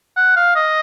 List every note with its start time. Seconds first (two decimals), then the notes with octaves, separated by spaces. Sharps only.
0.16 F#5
0.36 F5
0.56 D#5